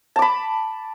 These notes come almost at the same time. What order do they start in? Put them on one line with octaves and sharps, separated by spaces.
A5 D6 B5